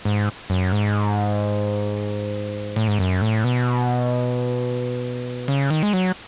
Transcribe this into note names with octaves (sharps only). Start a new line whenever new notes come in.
G#2
F#2
G#2
A2
G#2
F#2
A2
B2
C#3
D#3
G#3
F#3